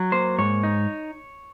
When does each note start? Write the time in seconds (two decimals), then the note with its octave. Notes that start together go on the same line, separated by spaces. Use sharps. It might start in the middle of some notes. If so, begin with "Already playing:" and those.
Already playing: F#3
0.12 A#3 C5
0.38 G#2 C#5
0.63 D#4